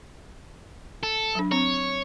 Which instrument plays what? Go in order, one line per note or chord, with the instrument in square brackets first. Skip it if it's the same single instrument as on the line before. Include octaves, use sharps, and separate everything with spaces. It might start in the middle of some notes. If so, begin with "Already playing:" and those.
[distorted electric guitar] A4
[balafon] F#3 D4
[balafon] C4 [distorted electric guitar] C#5